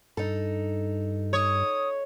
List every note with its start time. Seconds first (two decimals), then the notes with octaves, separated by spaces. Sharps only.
0.17 G2 D#4 A4
1.33 C#5 D#6